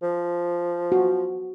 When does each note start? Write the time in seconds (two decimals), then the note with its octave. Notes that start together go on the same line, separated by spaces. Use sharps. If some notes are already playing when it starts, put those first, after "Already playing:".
0.02 F3
0.92 F#4